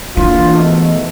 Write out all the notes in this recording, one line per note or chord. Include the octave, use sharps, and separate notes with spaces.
E3 A#3 D4 F4
G#2 B2 A3